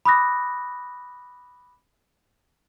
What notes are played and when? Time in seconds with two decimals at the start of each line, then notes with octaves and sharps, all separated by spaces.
0.05 B5 D6 D#6 F#6 A#6